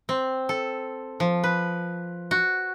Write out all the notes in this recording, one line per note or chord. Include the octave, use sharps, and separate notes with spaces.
C4
A4
F3
B4
F#4